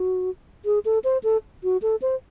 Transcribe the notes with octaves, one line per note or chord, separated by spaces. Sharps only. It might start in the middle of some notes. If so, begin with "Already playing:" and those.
Already playing: F#4
G#4
A4
C5
A4
F#4
A4
C5